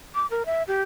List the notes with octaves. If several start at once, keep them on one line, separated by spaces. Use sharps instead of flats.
D6
A#4
E5
G4